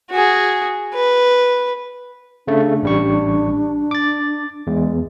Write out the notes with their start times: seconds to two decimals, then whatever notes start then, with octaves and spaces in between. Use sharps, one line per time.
0.11 F#4 G#4
0.94 B4
2.47 C#3 A3 D4
2.83 A1 G3 C#6
3.91 D6 A6
4.67 E2 G#3